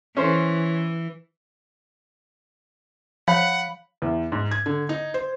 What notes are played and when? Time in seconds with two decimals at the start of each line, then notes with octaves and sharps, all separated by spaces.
0.17 E3 C#4 C5
3.28 F3 C#5 F5 F#5 B5
4.02 E2
4.32 G#2
4.51 G#6
4.66 D3
4.89 D#4
5.14 C5